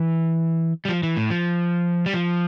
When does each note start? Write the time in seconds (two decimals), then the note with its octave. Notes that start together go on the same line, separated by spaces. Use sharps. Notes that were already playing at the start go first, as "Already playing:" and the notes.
Already playing: E3
0.85 G3
0.89 F3
1.03 E3
1.16 A2
1.30 F3
2.06 G3
2.14 F3